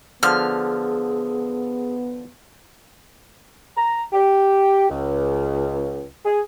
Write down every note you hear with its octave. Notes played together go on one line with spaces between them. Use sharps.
D3 F3 B3 G#4 F6
A#5
G4
C#2
G#4